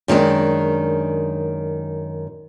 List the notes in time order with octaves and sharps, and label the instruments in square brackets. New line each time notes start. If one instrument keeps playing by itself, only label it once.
[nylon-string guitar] F#2 D#3 G#3 D4